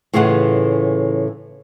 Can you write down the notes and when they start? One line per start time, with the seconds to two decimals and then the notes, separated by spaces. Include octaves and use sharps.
0.14 A2 C#3 E3 F4 G#4 F#5